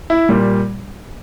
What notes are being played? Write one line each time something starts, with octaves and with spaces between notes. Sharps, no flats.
E4
A#2 G3